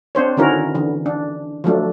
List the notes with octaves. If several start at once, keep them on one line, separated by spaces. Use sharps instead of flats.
C4 D4 C5 C#5
D3 D#3 C#4 E4 F#4 A#4
D3 E3
D4
F3 F#3 A3 D4